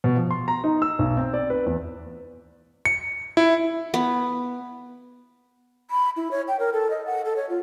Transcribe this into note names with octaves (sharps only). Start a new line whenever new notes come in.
B2
F3
C6
A#5
D#4
E6
B1
C4
D5
B4
E2
C#7
E4
B3
B5
E4
C#5
G5
A#4
A4
D#5
F#5
A4
C#5
F4